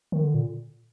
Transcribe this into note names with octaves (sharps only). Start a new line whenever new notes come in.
D#3
D3
A#2